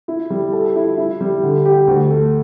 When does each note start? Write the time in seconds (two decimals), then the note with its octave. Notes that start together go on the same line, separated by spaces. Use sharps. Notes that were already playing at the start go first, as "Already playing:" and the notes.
0.08 E4
0.30 G3
0.53 A4
0.76 E4
0.97 E4
1.21 G3
1.43 D3
1.65 G4
1.88 D2
2.10 A3